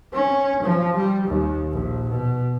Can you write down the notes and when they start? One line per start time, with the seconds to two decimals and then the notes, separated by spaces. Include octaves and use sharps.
0.13 C#4
0.62 F3
0.96 G3
1.27 D#2
1.72 A#1
2.10 B2